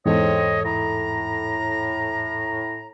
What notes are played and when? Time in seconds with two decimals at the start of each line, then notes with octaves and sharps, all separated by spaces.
0.06 E2 G#2 C4 A4 C#5 D#5
0.65 A2 A#5